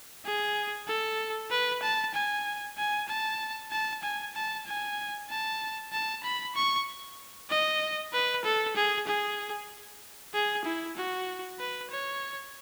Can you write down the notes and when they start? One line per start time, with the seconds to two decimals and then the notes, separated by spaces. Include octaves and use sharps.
0.25 G#4
0.87 A4
1.50 B4
1.83 A5
2.14 G#5
2.77 G#5
3.08 A5
3.71 A5
4.03 G#5
4.35 A5
4.66 G#5
5.30 A5
5.92 A5
6.24 B5
6.55 C#6
7.50 D#5
8.13 B4
8.45 A4
8.76 G#4
9.07 G#4
10.34 G#4
10.65 E4
10.97 F#4
11.59 B4
11.91 C#5